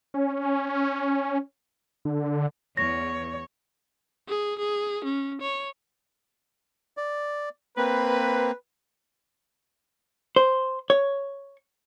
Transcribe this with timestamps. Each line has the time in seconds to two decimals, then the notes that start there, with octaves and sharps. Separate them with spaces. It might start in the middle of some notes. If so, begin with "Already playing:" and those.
0.14 C#4
2.05 D3
2.77 E2 C#5 A#6
4.29 G#4
4.59 G#4
5.05 C#4
5.42 C#5
6.97 D5
7.77 A#3 C4 B4
10.36 C5
10.90 C#5